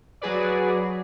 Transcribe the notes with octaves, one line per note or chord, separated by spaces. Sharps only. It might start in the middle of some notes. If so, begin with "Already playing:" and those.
F#3 F#4 G#4 B4 D5